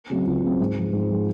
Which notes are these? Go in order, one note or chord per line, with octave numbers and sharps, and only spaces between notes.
C#3 F#3 C4
C#2
C#3 F#3 C4
G#2
F3 G#3
G#2
F3 G#3